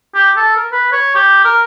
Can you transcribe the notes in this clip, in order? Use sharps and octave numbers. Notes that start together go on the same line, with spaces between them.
G4
A4
A#4
B4
C#5
G4
A#4